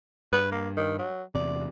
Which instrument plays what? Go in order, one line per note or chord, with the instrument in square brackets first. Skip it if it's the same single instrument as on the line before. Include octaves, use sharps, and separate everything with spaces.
[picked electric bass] G2 [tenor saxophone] B4
[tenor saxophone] A#3
D#3
F#3
[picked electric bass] E2 C3 [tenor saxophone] D5